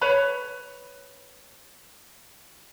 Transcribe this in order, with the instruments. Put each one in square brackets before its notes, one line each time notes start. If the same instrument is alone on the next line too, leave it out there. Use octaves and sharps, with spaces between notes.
[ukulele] B4 C#5 B5